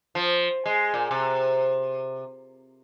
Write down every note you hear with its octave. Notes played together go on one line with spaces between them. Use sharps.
F3
G#3
A#2
C3